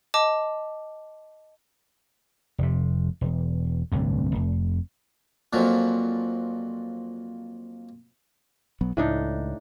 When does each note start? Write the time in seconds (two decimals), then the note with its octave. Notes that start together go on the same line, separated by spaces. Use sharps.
0.14 D#5 A5 D6
2.58 F1 C3
3.21 E1
3.92 D1 C2 G2
4.35 F1
5.53 F2 A#2 F3 F#3
8.81 B1 F#3 B3
8.97 C#2 A2 D4 D#4